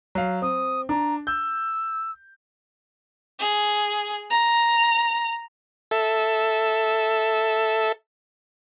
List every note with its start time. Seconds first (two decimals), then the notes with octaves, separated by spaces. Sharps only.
0.15 F#3 F5
0.42 C4 D#6
0.89 D4 A#5
1.27 E6 G6
3.39 G#4
4.30 A#5
5.91 A4 E5